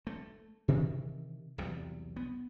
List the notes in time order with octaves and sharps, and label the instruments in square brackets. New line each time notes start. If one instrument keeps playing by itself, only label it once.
[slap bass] A3
C3 D#3 E3
B1 E2 C3 G3
B3